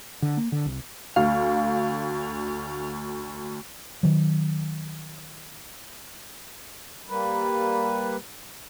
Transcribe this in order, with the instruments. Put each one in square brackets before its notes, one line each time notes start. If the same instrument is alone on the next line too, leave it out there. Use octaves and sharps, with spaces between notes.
[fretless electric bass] D3
A#3
D3
C2
[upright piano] D2 [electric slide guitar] F5
[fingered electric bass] D#3 F#3
[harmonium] G3 A#3 B4